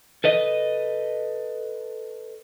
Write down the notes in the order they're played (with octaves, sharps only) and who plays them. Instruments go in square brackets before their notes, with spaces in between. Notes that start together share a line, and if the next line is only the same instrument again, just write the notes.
[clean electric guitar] A4 B4 D#5